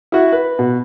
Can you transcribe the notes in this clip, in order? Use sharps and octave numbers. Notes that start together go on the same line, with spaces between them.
E4 F#4
B4
B2